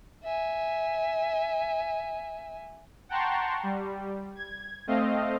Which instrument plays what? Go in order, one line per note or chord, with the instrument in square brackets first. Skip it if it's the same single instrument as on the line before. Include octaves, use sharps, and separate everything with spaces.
[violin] E5 G#5
[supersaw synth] F#5 G5 A5 A#5 C6 C#6
G3
G#6
A3 C4 D#5 F5